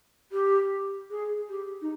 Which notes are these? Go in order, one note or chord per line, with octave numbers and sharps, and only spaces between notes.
G4
G#4
G4
D#4